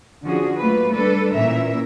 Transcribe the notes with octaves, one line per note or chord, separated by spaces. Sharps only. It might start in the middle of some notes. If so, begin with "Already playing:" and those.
D3 F3 C#4 F#4 G#4
F#3 A3 A#3 F4 B4
G3 D4 A4 B4
A#2 E3 A#3 C#4 A#4 E5